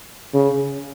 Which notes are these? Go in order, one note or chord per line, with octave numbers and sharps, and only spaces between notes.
C#3